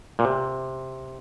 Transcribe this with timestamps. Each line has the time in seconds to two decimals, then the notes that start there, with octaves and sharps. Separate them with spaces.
0.19 A#2
0.25 C3